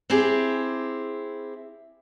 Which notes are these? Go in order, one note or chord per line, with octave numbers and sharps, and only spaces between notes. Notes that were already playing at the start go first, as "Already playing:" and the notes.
C4 E4 G4 G#4